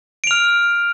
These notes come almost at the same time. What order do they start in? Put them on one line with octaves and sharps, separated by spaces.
D7 F7 F6